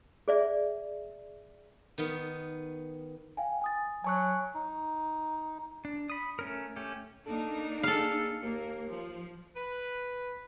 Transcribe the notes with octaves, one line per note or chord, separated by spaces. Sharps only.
G#4 D5 E5
D#3 B3
F5 G5 G#5
G#5 D#6 A6
F#3 C#5 G#5 A5 C#6 F#6
D#4
D4
B5 D#6
A3 C#4 A#4
A3 C#4 G4
A#3 D4 D#4 A4
G#4 A4 F5
D#2 A#3
F3
B4